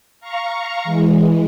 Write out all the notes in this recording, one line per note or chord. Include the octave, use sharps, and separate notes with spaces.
F5 A#5 C#6
E3 G#3